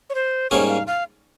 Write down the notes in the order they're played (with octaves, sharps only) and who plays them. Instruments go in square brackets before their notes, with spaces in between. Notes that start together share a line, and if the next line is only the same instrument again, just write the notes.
[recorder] C#5
C5
[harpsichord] G#2 G3 A#3 C#4 G#4 [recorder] C#5
[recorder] F5
F5